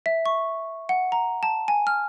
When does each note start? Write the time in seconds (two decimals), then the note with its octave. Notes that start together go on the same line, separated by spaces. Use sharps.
0.06 E5
0.26 C#6
0.89 F#5
1.12 A#5
1.43 A5
1.68 G#5
1.87 F6